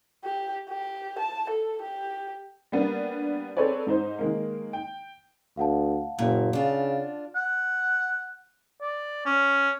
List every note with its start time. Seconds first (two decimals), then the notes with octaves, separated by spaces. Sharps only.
0.25 G4
0.69 G4
1.19 A5
1.50 A4
1.82 G4
2.72 G3 A#3 B3 D4
3.57 C4 G#4 A4 B4 C#5 D5
3.87 G#2 D#4 C5
4.19 D#3 G#3 A#3
4.73 G5
5.57 D2 F5 F#5 A5
6.19 F#1 A#2
6.53 C#3 D4 F4
7.36 F#5
8.82 D5
9.25 C#4